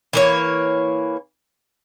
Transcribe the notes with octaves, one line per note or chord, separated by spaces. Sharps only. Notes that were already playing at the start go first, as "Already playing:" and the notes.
E3 A#3 C#5